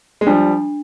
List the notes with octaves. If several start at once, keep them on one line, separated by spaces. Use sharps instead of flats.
G#3
F3 G3 D4